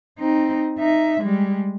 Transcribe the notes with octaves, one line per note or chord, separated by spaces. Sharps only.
C4 D#4
D#4 E5
G3 G#3